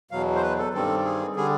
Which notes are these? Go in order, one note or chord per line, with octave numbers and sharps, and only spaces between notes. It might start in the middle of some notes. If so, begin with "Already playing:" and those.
E2 B2 F#3 F5
C5
B4
A4
G2 D#3 G3 C4 A4
G#4
D3 G3 G#4